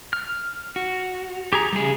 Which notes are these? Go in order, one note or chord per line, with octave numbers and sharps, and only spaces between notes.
F6
F#4
G4 G#4 A#5
C#3 G3 G#4